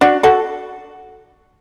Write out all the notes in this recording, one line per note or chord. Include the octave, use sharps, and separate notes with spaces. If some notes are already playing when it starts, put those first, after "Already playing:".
D4 F#4
F#4 A4